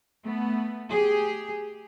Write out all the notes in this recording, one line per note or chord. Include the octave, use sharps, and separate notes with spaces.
A3 B3
G4 G#4